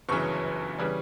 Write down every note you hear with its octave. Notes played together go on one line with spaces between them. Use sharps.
G1 F#2 C#3 E3 C#6
C#3 E3 G3